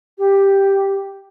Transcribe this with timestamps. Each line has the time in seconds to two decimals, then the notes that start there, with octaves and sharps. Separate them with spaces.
0.18 G4